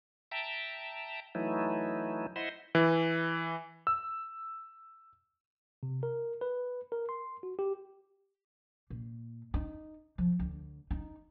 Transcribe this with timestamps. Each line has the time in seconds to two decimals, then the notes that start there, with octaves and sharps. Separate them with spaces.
0.31 E5 G5 A5 A#5
1.35 E3 F#3 A3 D#4 E4
2.36 E4 C5 D#5 E5 F#5 C6
2.75 E3
3.87 E6
5.83 C3
6.03 A#4
6.41 B4
6.92 A#4
7.09 C6
7.43 F#4
7.59 G4
8.90 A#2
9.54 D#4
10.18 F3
10.39 D2
10.91 D#4